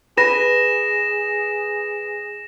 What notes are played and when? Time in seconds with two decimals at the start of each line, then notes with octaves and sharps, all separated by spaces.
0.17 G#4 B4 A#6 E7